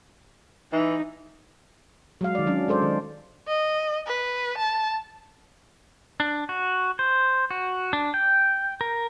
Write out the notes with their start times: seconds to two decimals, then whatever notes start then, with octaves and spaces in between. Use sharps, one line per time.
0.72 E3 D#4
2.21 F#3 G#3 F5
2.35 D#3 D5
2.47 F#3 C#4 D4
2.68 G#3 A4 C5 D5
2.82 D#3
3.48 D#5
4.07 B4
4.58 A5
6.20 D4
6.49 F#4
6.99 C5
7.51 F#4
7.93 D4
8.14 G5
8.81 A#4